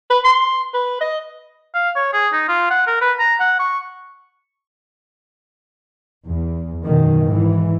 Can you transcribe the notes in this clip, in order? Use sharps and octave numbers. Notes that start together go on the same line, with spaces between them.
B4
C6
B4
D#5
F5
C#5
G#4
D#4
F4
F#5
A#4
B4
A#5
F#5
C#6
E2
F#2 B2 D#3
G#2 E3